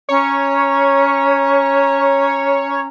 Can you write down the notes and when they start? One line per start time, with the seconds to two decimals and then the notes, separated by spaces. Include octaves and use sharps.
0.09 C#4 C#5 A#5